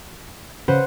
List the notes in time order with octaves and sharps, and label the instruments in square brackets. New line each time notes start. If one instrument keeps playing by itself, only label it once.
[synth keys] C#3 [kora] B4 C5 F#5